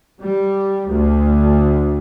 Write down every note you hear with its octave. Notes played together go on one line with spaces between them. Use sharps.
G3
D2